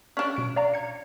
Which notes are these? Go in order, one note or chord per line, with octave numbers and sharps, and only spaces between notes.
C#4 D4
B2 D7
D5 F5 A#5
G#6 C#7